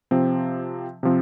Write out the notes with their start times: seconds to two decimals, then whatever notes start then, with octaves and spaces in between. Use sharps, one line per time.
0.11 C3 F3 C4
1.03 C3 F3 C4